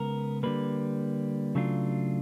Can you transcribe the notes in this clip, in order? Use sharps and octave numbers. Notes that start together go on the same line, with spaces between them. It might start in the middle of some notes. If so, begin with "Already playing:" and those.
Already playing: C#3 G#3 B3 A#4
D3 G3 A#3 B4
C#3 F#3 A3 D4 F4